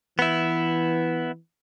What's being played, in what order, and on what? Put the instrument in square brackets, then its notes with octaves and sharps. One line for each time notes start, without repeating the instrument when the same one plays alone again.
[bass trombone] E3 [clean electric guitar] B3 E4